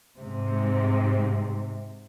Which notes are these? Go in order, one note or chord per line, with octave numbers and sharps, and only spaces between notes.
G#2 C3